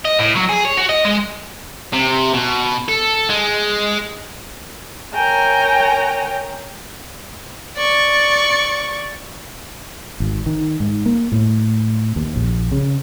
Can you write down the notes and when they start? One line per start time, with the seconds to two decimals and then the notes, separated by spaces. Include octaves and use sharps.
0.05 D#5
0.19 A2
0.36 F#3
0.49 G#4
0.65 C#5
0.77 F#4
0.89 D#5
1.05 G#3
1.93 C3
2.34 B2
2.88 A4
3.30 G#3
5.14 A#4 C#5 G5 G#5 A#5
7.77 D5 C#6
10.20 G#1
10.46 D#3
10.80 G#2
11.06 A#3
11.32 A2
12.16 D#2
12.36 A#1
12.72 C#3